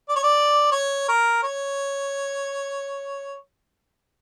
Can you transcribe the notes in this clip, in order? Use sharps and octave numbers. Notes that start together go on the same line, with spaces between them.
D5
C#5
D5
C#5
A#4
C#5